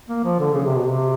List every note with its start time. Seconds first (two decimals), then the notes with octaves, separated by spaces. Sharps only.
0.09 A#3
0.24 F3
0.40 D3
0.54 C#3
0.65 C3
0.76 B2
0.87 C3